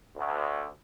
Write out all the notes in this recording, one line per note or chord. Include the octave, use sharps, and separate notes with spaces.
D2